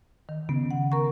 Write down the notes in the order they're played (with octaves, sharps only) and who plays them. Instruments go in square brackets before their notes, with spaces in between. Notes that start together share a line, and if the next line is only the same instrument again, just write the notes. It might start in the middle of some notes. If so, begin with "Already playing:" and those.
[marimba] D#3
[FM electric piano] C#3 [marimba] B3
[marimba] F#5
A#4 A#5 C#6